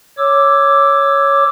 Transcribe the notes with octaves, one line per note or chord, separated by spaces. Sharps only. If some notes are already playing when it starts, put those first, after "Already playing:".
C#5 D6 E6